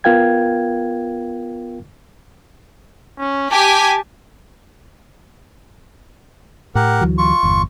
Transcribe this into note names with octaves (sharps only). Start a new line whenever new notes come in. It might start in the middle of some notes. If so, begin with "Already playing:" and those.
B3 F4 A#4 F5 G5 G#6
C#4
G4 G#5 A5 B6
A2 G4 A#4 F#5
D2 E3 F#3
F4 C#6
G1 E2